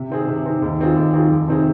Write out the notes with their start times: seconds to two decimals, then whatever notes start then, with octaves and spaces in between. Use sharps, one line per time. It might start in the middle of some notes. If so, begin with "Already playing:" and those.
Already playing: C3
0.10 D#3 C4 G#4
0.28 C3
0.45 D#3 C4 G#4
0.62 D#2
0.79 D#3 C4 F4 G#4
0.96 D#2
1.13 D#3 C4 F4 G#4
1.30 F2
1.48 C3 D#3 C4 G#4